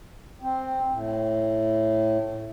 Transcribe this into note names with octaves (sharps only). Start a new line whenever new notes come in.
C4
A2